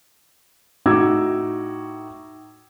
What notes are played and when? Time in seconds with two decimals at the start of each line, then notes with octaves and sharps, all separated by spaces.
0.86 A2 D#4 F#4 D6 E6 G#6